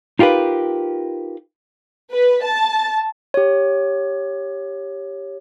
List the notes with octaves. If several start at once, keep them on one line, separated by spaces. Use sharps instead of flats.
D#4 F4 G4 A#4 B4
B4
A5
G4 C#5